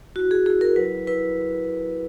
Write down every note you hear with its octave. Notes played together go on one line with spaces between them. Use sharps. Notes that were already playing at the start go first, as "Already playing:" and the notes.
E4 F#4
G#4
E4 G#4
A#4
F#3 B4
E4 B4